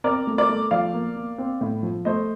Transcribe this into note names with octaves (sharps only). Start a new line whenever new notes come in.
C4 A#4 D5
A3
A#4 D5
A3
F3 D5 F5
A#3
A#3
C4
A2
F3
A3 C5 D#5